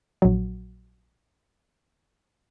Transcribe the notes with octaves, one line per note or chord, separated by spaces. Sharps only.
A#1 F#3